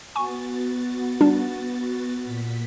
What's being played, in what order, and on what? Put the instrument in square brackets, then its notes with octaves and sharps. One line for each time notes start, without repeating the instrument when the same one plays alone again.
[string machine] B3 F#4 A6 [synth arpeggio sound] G#5 C#6
[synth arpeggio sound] G3 D4
[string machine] A#2 B6